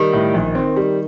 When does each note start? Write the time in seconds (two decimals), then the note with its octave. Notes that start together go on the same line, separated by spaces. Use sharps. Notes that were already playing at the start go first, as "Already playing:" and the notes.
Already playing: D#3 G3
0.13 A2
0.34 A#1
0.55 C4
0.76 G3